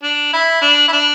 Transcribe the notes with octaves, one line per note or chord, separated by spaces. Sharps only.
D4
E4
D4
E4
D4